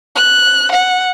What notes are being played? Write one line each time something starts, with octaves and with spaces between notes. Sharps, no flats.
F#6
F#5